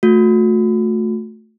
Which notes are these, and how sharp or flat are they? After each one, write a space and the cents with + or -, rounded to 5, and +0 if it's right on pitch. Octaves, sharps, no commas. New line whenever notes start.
A3 -5 F#4 -40